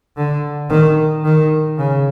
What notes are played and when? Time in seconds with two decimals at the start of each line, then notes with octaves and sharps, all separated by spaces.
0.17 D3
0.70 D#3
1.25 D#3
1.78 C#3